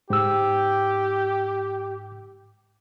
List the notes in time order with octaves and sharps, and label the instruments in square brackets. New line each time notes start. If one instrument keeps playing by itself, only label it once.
[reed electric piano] G#2 E6 [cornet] G4